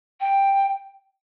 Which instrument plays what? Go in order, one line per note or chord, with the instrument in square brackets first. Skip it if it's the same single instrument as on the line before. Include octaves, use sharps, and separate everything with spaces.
[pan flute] G5